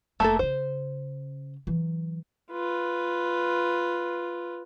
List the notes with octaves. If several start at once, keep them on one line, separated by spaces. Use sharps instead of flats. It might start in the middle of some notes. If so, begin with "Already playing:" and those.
F1 A3 A#3 A4
C#3 C#4 C5
E3 F#3
F4 B4